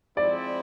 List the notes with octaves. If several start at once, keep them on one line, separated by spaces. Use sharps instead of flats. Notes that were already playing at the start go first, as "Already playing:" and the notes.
F3 G#3 C4 E4 D5